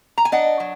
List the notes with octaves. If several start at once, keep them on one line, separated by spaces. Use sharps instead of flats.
A#5
G#5
D4 D#5 F#5
F#3